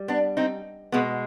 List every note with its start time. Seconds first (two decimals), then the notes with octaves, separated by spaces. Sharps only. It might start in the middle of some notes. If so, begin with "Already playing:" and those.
Already playing: G3
0.08 B3 D4
0.37 C4 D#4
0.92 B2 G#3 B3